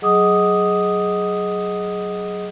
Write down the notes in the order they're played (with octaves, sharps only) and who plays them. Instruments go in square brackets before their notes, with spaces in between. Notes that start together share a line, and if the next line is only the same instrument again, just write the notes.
[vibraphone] F#3 G#4 D#5 F#5 D6 D#6